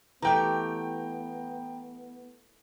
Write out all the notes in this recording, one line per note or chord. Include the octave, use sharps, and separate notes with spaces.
E3 A3 B3 G4 G5 A#5